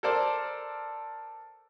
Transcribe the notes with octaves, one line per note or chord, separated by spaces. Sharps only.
A4 A#4 C5 D5